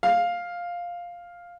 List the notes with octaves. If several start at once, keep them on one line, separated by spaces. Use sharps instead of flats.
F5